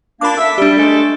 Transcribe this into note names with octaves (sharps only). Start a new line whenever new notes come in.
A#2 A#3 D4 B5 D6
A4 E5
G3 D4 G4
G#3 A3 A4